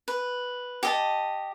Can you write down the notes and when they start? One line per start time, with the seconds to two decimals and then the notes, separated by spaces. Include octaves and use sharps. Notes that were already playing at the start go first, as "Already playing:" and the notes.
0.08 B4
0.83 G4 D#5 A5